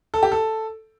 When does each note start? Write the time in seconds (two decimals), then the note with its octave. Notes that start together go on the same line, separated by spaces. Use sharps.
0.14 A4
0.23 G4
0.32 A4